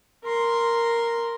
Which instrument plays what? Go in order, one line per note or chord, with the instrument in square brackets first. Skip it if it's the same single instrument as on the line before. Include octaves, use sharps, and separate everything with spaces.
[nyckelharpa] A#4 C6